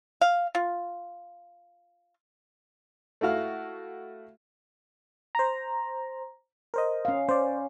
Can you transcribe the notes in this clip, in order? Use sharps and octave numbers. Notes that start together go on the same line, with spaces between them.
F5
F4
A3 E4 F#4 F5
C5 A#5
A#4 C5 D#5
C#4 F5
C#4 C5 D5